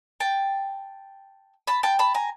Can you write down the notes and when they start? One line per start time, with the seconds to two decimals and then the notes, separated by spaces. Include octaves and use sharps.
0.20 G5 A5
1.67 A5 B5
1.83 G5 A5
1.99 A5 B5
2.14 G#5 A#5